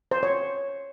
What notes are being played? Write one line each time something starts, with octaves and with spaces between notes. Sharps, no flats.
C5
C#5